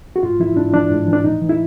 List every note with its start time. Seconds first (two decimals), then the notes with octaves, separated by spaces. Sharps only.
0.16 F#4
0.23 G#2 F4
0.40 E3 E4
0.57 G#2 D4
0.74 E3 D4
0.91 G#2
1.08 E3
1.13 D4
1.24 A2 D#4
1.42 E3
1.49 E4